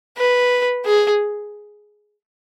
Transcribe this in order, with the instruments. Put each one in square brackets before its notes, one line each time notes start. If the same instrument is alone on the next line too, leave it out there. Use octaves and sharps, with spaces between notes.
[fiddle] B4
G#4